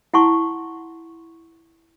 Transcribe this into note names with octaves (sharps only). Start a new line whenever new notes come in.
E4 F#5 A5 A#5 C6 C#6